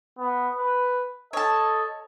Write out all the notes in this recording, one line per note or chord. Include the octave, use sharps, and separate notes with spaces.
B3
B4
A4 C#5 D#5 A5